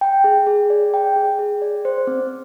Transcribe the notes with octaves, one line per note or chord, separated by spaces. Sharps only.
G5
G#4
G#4
D5
G5
G#4
G#4
D5
C5
C4